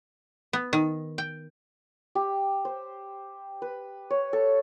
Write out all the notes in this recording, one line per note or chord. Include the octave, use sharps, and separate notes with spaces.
B3
D#3
G5
G4
C5
B4
C#5
A4